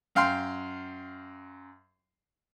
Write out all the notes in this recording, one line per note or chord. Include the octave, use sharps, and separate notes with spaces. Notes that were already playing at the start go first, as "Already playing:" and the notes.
F#2 F5 G5 C6